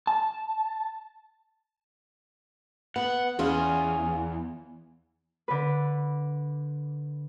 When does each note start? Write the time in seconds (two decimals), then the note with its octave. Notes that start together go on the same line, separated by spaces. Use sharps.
0.07 A5
2.96 B3 F#5
3.39 E2 C#4 F4 G#4
5.48 D3 B4